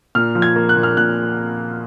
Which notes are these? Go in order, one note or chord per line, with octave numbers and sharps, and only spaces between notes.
A#2 F6
F3
G#6
A#3
F#6
A#2
F6
A#2 F#6